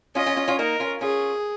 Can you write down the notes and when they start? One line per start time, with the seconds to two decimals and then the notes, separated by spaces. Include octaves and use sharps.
0.15 C#4 F4 D#5
0.26 C#4 F4
0.37 C#4 F4
0.48 C#4 F4
0.58 A#3 D#4 A#4
0.80 C#4 F4
1.01 C#4 F4 G#4